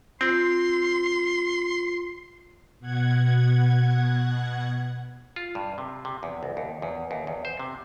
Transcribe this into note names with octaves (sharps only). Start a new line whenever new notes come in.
C4 F4 C6
B2 F#5 G#6
F4
G2
C3
C3
E2
C2
D#2
E2
D#2
E2
C5
C3